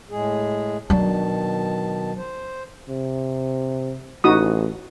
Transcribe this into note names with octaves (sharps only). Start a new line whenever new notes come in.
A2 G#3 G#4
B2 D#3 F#3 D4 A5
C5
C3
A1 D#4 F#4 D#6